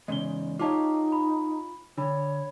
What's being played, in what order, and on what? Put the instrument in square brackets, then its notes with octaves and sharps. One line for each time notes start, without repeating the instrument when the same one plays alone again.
[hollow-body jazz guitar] E2 G#2 C#3 [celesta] D#5 G7
[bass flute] D#4 [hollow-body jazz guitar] F4 G4 C#5 [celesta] D#5 A5 D6
[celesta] B5
[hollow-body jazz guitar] D3 [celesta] D4 B5 [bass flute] C#5